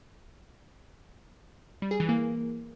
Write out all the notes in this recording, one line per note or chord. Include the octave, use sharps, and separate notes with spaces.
G3
G#4
E3
A#3